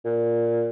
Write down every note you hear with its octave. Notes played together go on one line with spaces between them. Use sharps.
A#2